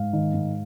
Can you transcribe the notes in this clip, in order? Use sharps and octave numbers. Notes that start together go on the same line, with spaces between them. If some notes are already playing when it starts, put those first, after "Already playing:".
Already playing: G#2 F5
D#3
G#2